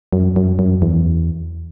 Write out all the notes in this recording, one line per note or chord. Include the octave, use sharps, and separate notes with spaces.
F#2
F#2
F#2
E2